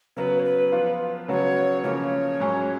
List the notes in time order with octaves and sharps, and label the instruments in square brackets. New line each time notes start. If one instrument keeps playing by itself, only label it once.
[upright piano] C#3 F#3 B3 [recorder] B4
[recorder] C#5
B4
[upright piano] F3 B3 F4
[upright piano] C#3 F#3 B3 F#4 [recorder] C#5
[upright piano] C#3 F3 A#3 C#4 [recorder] C#5
[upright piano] G#2 F#3 C#4 G#4